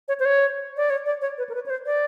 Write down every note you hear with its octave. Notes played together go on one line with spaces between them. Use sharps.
C#5
C5
C#5
D5
C#5
D5
C#5
B4
A#4
B4
C#5
C5
D5